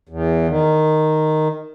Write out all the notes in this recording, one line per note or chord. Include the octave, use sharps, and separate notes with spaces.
E2
D#3